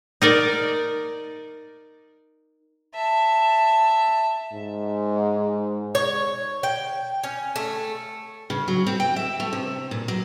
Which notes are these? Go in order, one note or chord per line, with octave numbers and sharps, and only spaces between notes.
D#4 A#4 D5
E5 A5
G#2
C#5
G5
C#4
A3
C#3
F#3
C4
G5
E5
A3
C3
A#2
F#3